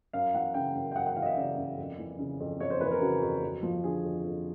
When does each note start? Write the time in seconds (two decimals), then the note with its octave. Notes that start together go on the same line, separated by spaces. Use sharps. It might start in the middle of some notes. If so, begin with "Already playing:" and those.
0.13 F#2 F5
0.34 E3 F#5
0.54 C#3 G5
0.75 F#2
0.91 G5
0.96 F#2 F#5
1.06 F#5
1.16 E3 F5
1.22 D#5
1.26 E5
1.37 C#3 D5
1.57 F#2
1.78 F2
1.99 E3
2.19 C#3
2.40 F2
2.60 F2 C#5
2.70 C5
2.81 E3 B4
2.91 A#4
3.01 C#3 F#4
3.22 F2
3.43 F2
3.63 F3
3.84 D3 G#4
4.05 F2
4.24 F2